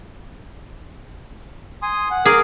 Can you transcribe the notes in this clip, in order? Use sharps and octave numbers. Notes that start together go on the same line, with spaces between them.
G#5 C6 D#6
F#5
G#4 A#4 D6